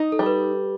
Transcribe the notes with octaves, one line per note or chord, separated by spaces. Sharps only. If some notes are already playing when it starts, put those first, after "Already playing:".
Already playing: D#4
A4
G3
B4